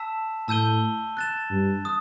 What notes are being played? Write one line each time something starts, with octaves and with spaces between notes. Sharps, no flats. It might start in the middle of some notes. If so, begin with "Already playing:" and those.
Already playing: A5 E6 B6 E7
A2 A5 E6 G6 D#7 G7
F#6 A6 E7
G2
D#6